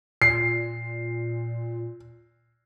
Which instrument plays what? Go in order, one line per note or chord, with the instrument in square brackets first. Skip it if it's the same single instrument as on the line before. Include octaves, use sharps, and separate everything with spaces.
[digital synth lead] A#2 [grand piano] C7